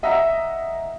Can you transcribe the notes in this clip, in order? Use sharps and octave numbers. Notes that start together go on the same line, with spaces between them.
D#5 E5 F#5 A#5